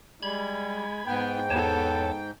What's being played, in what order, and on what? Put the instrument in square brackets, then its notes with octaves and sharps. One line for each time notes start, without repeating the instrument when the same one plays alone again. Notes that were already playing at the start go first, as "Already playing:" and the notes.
[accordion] G3 [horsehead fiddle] G#3 [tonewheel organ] B5 G#6
[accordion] G#2 G5 [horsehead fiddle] B3
[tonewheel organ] E2 C#5 A5 [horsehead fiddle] B3 A4